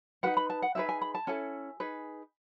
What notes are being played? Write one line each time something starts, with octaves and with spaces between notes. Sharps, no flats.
D#4 F#4 B4 F#5
B5
A5
F#5
D#4 G#4 B4 E5
G#5
B5
A5
C#4 E4 A4 G#5
D#4 G#4 B4